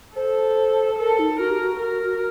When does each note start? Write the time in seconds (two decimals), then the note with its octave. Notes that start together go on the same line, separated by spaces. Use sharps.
0.16 A4 C5
0.99 A4 A#4
1.19 D#4
1.40 F#4 A#4
1.51 G4
1.62 F#4
1.82 A#4